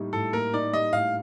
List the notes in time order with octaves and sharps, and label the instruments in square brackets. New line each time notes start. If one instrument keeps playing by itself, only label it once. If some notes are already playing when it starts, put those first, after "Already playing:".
Already playing: [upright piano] A2 G3 A#3 D#4
[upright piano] A2 [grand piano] A4
[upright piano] A#3 [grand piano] A#4
[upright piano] D#4 [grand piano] D5
[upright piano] G3 [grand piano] D#5
[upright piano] A2 [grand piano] F5